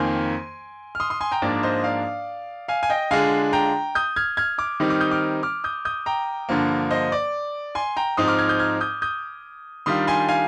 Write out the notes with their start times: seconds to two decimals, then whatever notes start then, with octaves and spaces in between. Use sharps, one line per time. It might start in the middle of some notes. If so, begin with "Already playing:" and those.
Already playing: F2 D#3 A#3 G#5 C6
0.95 F6
1.00 C6 D#6
1.10 C6 D#6
1.21 G#5 C6
1.32 G5 A#5
1.42 G#2 F3 A#3 D4 D5
1.63 C5 D#5
1.84 D5 F5
2.68 F5 G#5
2.83 G#5
2.90 D#5 G5
3.11 D3 G#3 D4 F4 F5 G#5
3.53 G5 A#5
3.95 D#6 G6
4.16 F6 G#6
4.37 F6 G#6
4.58 D6 F6
4.80 D#3 G3 C4 D#4
4.90 D6 F6
5.01 D#6 G6
5.11 D6 F6
5.43 D6 F6
5.64 D#6 G6
5.85 D#6 G6
6.06 G5 A#5
6.49 G2 D3 F3 A#3
6.91 C5 D#5
7.12 D5
7.75 G#5 C6
7.96 G5 A#5
8.17 G#2 F3 C4 D#4 C6 D#6
8.28 D6 F6
8.38 F6 G#6
8.49 D#6 G6
8.59 F6 G#6
8.81 D#6 G6
9.02 D#6 G6
9.86 D#3 G3 D4 F4 C6 D#6
10.07 G#5 C6
10.29 F5 G#5